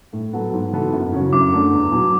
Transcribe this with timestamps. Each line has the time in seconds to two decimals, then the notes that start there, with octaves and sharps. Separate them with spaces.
0.13 A2
0.33 F#3 B3 F#4 A4
0.53 G#2
0.73 E3 B3 F#4 A4
0.93 F#2
1.12 C#3 F#3 C#4 F#4
1.33 F#2 D6
1.53 D3 A3 D4
1.72 E2
1.92 B2 F#3